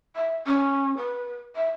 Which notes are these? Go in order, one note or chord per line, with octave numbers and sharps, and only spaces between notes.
E5
C#4
B4
E5